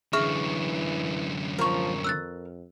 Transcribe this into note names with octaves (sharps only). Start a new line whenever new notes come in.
F#2 D3 E3 G#4 E5 C#6 F6
F3 A#4 C#6
F2 E6 F#6 A6